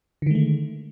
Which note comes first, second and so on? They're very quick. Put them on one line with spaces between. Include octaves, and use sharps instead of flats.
D3 D#3 G#3 A3